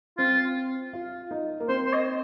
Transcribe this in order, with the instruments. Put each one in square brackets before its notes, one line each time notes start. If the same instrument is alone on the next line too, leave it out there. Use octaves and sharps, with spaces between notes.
[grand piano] C4 [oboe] F4
[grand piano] F4
D#4
A#3
[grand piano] C4 [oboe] C5
[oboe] C5
D#5